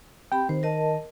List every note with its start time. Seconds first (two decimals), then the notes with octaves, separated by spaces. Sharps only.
0.32 C4 G4 G5 B5
0.49 D#3 C5
0.63 A#4 D#5 A5